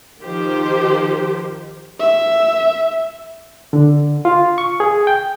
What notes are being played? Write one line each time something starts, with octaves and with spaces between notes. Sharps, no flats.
D#3 F3 G4 C5
E5
D3
F4
C#6
G#4
G5